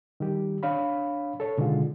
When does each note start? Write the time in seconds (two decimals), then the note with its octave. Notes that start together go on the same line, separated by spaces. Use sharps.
0.20 D#3 G3 G4
0.63 D4 C#5 F5 B5
1.40 A4 C#5
1.58 B2 D3 D#3 G#3 F4